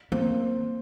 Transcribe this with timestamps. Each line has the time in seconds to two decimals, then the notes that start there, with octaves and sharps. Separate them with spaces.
0.12 A#3 C4